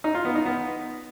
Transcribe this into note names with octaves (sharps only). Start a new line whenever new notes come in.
D#4
F4
B3
D#4
B3